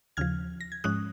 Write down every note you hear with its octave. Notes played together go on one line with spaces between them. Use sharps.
D#2 C#3 F3 F6 G#6
A#6
G#6
G#2 F3 G#3 C#4 D#6 F#6